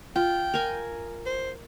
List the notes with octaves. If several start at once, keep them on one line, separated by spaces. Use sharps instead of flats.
F4 G5
A#4 G#5
C5